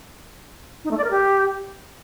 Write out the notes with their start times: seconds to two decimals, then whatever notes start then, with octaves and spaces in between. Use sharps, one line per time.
0.84 D#4
0.91 A3
0.97 D5
1.04 A#4
1.10 G4